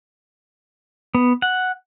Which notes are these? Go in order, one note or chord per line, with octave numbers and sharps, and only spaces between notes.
B3
F#5